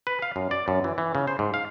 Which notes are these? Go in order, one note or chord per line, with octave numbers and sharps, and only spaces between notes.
B4
F5
F#2
D5
F#2
E3
E3
C#3
C5
G#2
F5